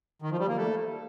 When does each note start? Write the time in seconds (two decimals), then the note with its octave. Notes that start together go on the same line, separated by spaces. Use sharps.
0.22 D#3
0.31 F3
0.39 G3
0.48 A#3
0.57 A3